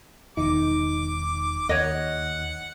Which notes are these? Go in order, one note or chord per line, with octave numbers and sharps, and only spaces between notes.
E1 D#3 D#4 D6
D#2 C#5 D#5 F#5